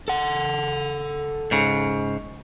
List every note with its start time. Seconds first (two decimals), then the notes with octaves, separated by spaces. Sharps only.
0.08 A4 F#5
1.51 G#2 C#3